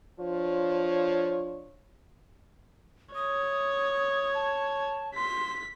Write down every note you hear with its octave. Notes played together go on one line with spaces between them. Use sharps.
F3 D4 F4 C#5
C#5 D#6
A5
C6 B6